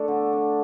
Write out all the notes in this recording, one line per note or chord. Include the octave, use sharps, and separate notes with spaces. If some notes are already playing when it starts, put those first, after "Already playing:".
Already playing: A3 D4 A4
D3
D4